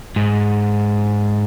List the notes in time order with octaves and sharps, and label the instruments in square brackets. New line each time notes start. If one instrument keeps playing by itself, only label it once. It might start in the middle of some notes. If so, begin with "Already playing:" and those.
[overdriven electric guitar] G#2